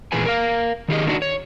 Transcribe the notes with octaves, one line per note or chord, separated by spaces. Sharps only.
A#2 E3 G#4 B4 G#5
A#4 F5
D#3 G4 G#4 D#5
D#3 G3 A#3 D4 D#4 F#4
C#5